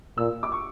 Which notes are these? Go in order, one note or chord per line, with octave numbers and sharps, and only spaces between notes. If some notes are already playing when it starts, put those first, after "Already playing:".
A#2 E6
D6
C#6